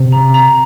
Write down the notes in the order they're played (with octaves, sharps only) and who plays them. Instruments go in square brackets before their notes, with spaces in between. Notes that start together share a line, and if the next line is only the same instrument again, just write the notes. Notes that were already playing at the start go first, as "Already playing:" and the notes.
Already playing: [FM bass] C3
[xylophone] A#5
A#5